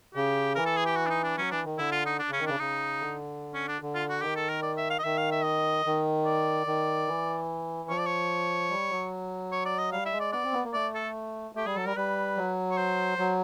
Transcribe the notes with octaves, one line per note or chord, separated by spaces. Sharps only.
C#3 G4
E3 A#4
A4
G#4
G4
F#4
D4
D#4
D4
F#3 C#4
E3 D4
D#3
D3 E4
F4
D#4
D4
C#3 C#4
D#3
C#3 D4
C#3 D#4
D3
C#4
D4
D3
F4
F#4
D#3 G4
A4
A#4
D5
E5
F5
D#5
D#3 E5
F5
E5
D#5
D#3
D5
D#3
E3
F3 C#5
D5
C#5
G3
F#3
C#5
D5
D#5
G3 F5
E5
G#3
D5
B3 D5
C4
B3
A#3
A3 D5
A4
A3 G4
G3 G#4
F#3 A4
G3 A#4
G3 B4
F#3
C#5
C5
F#3